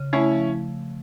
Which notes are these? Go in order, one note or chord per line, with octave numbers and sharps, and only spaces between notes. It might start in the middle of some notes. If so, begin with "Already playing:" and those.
Already playing: C#3
A3 C#4 E4
F3